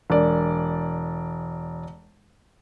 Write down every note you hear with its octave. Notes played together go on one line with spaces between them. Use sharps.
E1 D5